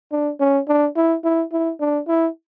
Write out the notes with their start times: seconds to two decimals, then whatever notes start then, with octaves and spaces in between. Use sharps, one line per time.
0.12 D4
0.40 C#4
0.68 D4
0.96 E4
1.24 E4
1.52 E4
1.80 D4
2.08 E4